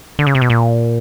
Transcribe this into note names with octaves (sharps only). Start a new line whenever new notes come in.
D3
C#3
C3
B2
A#2